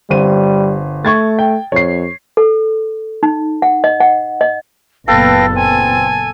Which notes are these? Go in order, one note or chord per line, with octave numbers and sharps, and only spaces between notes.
G1 G3 C4 D#7
A3 C#6 G#6 A6
G5
F2 C#5 C7
A4
D#4
F#5
D#5
F#5
D#5
F#1 A#2 B3 A4 B4 F5 G5 A#6
C4 G#5